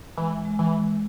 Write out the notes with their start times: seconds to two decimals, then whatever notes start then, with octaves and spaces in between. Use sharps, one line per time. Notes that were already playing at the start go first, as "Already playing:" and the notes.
0.17 E3 G#3
0.45 G#3
0.59 E3
0.73 G#3